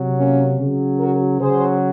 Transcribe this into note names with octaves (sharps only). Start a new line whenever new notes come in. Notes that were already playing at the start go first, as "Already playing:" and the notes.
Already playing: C3 F#3
A#3 C#4
C#3 F#3
F#4 A#4
C#3 F#3 G#4 C5